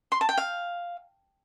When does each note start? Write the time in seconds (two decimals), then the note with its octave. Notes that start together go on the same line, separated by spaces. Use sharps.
0.12 C6
0.21 A5
0.29 G5
0.38 F5